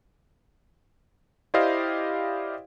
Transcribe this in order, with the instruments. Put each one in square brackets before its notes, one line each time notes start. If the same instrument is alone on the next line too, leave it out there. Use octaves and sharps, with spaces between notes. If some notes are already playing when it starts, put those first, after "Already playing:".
[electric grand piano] E4 G4 C5 D5 D#5 F5